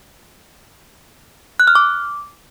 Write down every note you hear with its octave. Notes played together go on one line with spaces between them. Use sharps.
F#6
F6
D6